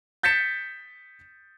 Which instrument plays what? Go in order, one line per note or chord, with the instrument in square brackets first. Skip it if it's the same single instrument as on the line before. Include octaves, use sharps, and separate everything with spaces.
[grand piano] G6 A6 B6 C#7 E7